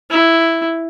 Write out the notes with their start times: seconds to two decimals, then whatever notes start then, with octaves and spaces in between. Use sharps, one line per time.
0.10 E4